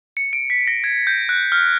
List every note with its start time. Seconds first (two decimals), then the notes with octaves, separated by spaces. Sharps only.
0.17 C#7
0.33 D7
0.50 B6
0.67 A#6
0.84 G#6
1.07 G6
1.29 F#6
1.52 F6